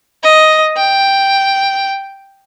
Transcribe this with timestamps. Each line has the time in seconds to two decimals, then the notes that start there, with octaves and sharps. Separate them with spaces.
0.23 D#5
0.77 G5